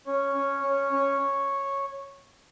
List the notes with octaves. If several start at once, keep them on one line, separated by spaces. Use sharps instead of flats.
C#4 C#5
C#4
C#4
C#4